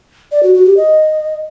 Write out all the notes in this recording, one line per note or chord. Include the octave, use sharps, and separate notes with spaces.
D5
F#4
F#4
G4
D#5